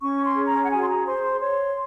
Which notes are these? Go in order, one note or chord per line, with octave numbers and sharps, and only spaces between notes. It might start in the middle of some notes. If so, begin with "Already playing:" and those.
C#4 C#6
C6
G#4
A#5
F#5
F#4 G#5
C6
A#5
C5 C6
C6
C#5 C6